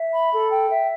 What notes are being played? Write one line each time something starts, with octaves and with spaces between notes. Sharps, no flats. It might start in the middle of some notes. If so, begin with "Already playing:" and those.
Already playing: E5
B5
A4
G5
E5